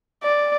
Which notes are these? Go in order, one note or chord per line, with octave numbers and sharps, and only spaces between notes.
D5